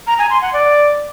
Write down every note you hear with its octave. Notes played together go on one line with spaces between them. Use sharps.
A#5
G#5
C6
F#5
D5